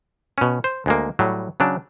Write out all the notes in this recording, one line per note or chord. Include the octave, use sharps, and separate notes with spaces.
B2 C#4
C5
D2 G#3 A#3
A2 F#3 G3
C#3 F#3 D4